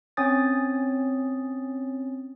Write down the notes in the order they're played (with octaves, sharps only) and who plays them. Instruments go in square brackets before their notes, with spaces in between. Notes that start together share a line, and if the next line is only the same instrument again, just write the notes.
[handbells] C4 C#4 C#5 G#5 D#6 A6